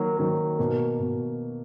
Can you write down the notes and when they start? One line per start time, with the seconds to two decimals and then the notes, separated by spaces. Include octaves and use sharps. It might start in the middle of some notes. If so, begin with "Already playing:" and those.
Already playing: D#3 F#3 A#3
0.17 D#3 F#3 A#3
0.59 B2 A#3
1.00 B2